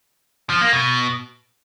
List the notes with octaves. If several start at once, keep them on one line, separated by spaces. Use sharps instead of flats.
F3
A#3
B2